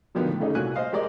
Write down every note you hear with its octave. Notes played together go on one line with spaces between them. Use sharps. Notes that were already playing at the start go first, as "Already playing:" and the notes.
B2 D3 D#3 F3 B3
A2
C#3 A3 C#4 D#4 G4 G#4
C2 A#2 E4 F#4 G#5 F#6
C5 D#5 F5
G#3 G4 A#4 D5 D#5